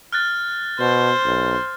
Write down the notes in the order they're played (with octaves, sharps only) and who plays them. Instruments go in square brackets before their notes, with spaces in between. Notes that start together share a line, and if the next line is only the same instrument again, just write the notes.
[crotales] F6 F#6 A6
[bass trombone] B2 [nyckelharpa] C5
[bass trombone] B1